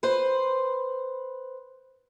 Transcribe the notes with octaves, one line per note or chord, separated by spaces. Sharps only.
B4 C5